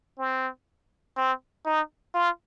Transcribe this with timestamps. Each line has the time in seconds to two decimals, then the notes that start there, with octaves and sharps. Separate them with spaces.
0.19 C4
1.17 C4
1.66 D#4
2.14 F4